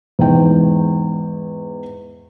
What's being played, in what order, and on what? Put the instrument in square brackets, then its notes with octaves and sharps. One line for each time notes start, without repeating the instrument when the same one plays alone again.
[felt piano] E2 G#2 G5